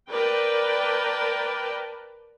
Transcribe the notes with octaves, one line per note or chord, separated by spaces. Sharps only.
A#4 B4 D5 G5 A5